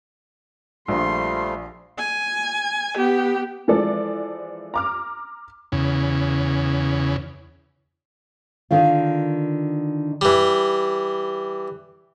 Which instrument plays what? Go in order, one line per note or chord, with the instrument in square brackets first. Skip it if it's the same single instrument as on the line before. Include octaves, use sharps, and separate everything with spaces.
[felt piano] A#1 [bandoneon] F3 G3 A3 [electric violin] C6
[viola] G#5
B3 G4
[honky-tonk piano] E3 F3 G#3 A4 D5
A#5 D6 F6
[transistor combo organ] E2 C#3
[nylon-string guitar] D3 D#3 F4
[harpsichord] E3 G3